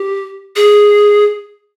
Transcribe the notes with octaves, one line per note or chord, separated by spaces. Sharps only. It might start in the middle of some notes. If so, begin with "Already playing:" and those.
Already playing: G4
G#4